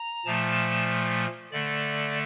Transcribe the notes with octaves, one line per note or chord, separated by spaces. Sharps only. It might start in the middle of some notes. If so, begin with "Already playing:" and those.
Already playing: A#5
A#2 F3 A3 A5
D3 A3 D5